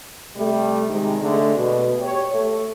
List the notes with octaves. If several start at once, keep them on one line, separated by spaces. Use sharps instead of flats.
C3 G3 A3
C3 D#3 G#3
D3 G#3 A3
B2
G4 C#5
A3